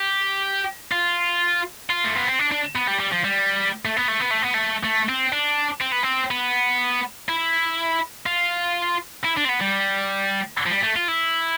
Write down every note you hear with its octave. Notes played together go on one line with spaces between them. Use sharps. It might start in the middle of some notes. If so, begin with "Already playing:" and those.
Already playing: G4
F4
F4
A3
B3
C4
D4
D4
B3
G3
G3
F3
G3
A3
B3
A3
B3
A3
B3
A3
A3
C4
D4
C4
B3
C4
B3
E4
F4
E4
D4
C4
B3
G3
F3
G3
A3
F4
E4